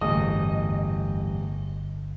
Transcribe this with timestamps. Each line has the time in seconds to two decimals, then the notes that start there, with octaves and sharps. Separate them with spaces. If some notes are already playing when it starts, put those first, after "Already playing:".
0.01 D1 G1 E2 G3 D#5 D#6